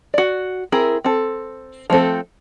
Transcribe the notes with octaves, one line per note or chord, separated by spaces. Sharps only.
F#4 D5
C4 E4 G#4 A#4
C4 A4
F3 A3 C4 A4